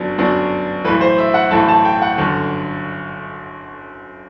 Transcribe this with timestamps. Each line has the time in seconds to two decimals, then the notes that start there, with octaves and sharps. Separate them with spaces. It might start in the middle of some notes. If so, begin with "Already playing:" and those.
Already playing: G1 F#2 F#3 B3 D4
0.18 G1 F#2 F#3 B3 D4
0.84 B1 A2 E3 B4
1.01 C5
1.18 E5
1.34 F#5
1.51 B1 A2 E3 A5
1.68 A5
1.85 G5
2.02 F#5
2.18 G1 F#2 D3